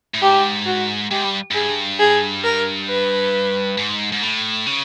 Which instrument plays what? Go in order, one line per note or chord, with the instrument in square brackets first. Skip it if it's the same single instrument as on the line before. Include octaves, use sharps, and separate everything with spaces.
[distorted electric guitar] A2
[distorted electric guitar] G#2 [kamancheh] G4
[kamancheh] F#4
[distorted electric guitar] G#2 [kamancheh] G4
[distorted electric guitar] G2
[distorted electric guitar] G2 [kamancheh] G#4
[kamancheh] G#4
A#4
B4
[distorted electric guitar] G#2
G#2
A2
C#3